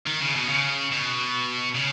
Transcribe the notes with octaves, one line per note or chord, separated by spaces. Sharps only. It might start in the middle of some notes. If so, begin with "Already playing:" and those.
D#3
C#3
B2
C#3
B2
C#3